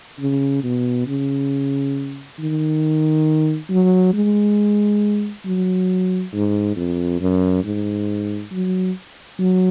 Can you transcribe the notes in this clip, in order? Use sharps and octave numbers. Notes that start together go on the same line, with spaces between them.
C#3
B2
C#3
D#3
F#3
G#3
F#3
G#2
F2
F#2
G#2
F#3
F#3